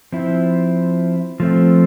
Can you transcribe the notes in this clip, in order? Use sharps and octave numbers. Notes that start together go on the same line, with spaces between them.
F3 C4 E4
F3 A3 C4